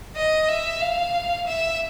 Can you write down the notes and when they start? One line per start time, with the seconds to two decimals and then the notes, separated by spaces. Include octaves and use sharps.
0.16 D#5
0.48 E5
0.81 F5
1.47 E5